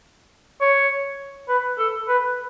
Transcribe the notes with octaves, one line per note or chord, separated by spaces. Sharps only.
C#5
B4
A4
B4